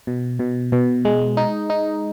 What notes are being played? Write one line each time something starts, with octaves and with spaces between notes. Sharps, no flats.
B2
B2
B2
G#3
D#4
D#4